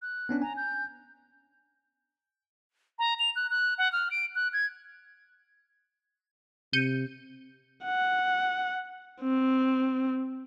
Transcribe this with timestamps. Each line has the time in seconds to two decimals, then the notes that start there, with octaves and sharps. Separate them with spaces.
0.02 F#6
0.29 B3 C#4 D4
0.42 G#5 A#5
0.57 G6
2.99 A#5
3.19 F7
3.36 F#6
3.51 F#6
3.78 F#5
3.92 F6
4.11 D7
4.35 F#6
4.53 G#6
6.73 C3 G6 C#7 D#7
7.84 F#5
9.22 C4